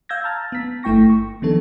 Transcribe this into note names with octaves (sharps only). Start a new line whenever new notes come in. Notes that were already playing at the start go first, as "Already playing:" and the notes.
F5 E6 G6 G#6 A#6
A5 A#5 E6 F6 A6
B3 B6
G1 A3 E4 G5 C#6 A#6
C#6
D#3 F3 B3 D4 A4